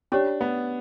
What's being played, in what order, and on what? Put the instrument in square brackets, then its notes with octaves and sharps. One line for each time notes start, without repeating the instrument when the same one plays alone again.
[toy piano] C#4 G4 C#5 [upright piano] D4
[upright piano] B3